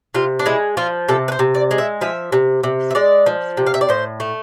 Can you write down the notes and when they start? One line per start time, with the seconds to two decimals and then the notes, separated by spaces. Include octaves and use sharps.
0.14 C3 F4
0.39 D4
0.46 G#3 E4
0.77 F3 F4
1.09 C3 A4
1.28 B4
1.32 C5
1.39 C3
1.55 D5
1.71 G#3
1.78 E5
2.01 F3 E5
2.32 C3
2.63 C3
2.91 E5
2.95 G#3 D5
3.26 F3
3.57 C3
3.67 F5
3.74 E5
3.81 D5
3.89 A2 C5
4.20 A3